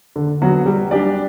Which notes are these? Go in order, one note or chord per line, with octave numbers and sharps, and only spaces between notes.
D3
F#3 B3 F#4
G3
D4 G4 D5